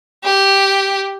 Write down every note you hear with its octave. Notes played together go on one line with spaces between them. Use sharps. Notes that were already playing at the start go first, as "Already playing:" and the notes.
G4